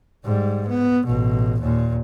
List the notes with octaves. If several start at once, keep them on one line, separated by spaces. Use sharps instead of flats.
G#2 G3
B3
A1 B2
D#2 A#2